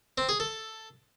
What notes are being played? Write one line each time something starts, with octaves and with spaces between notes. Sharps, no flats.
C4
G#4
A4